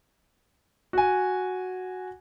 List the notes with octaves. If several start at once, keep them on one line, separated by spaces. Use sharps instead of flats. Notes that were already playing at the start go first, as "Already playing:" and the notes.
F#4 G#5